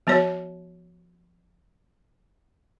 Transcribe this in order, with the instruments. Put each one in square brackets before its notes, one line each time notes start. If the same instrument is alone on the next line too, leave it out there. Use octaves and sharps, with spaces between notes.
[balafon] F3 B3 F#4 C#5